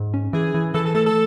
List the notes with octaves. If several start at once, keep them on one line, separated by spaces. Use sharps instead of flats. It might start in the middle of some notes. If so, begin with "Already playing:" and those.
Already playing: G#2
C#4
E3 G#4
E3
E3 A4
A4
A3 A4
A4